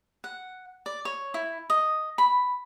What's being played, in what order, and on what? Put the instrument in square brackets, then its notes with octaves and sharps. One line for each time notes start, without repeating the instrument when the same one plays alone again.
[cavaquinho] F#5
D5
C#5
E4
D#5
B5